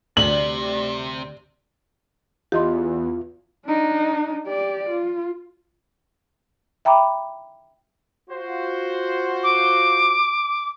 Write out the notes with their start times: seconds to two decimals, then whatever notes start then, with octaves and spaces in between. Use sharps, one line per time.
0.17 D2 C3 G3 F#7
2.52 E2 F4 G4 D#5 C6
3.66 D4 D#4
4.46 G4 D5
4.90 F4
6.85 E5 G5 A#5 B5 D6
8.30 F4 F#4 C5
9.43 D6